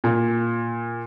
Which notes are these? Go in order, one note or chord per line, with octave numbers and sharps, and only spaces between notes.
A#2